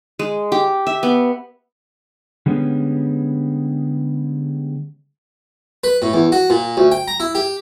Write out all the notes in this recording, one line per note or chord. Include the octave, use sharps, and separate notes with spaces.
G#3
G4
E5
B3
D3 G3 G#3 B3 C#4
B4
A2
E2
F#4
A#2
D2
G5
A#5
E4
G4